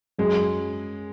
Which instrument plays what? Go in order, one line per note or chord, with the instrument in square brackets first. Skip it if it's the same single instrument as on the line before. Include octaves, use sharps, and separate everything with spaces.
[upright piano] F#2 [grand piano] G#3